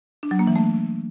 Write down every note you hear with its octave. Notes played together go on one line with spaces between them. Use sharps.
D4
F#3
A#3
E3
A3